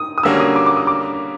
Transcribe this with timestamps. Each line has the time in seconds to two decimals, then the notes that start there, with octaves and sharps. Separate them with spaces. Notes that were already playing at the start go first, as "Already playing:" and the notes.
Already playing: D#4 D#6
0.18 D#6
0.23 D3 G3 A#3 C#4 F#4 E6
0.40 D#6
0.56 D6
0.66 D6
0.77 D#6
0.87 D6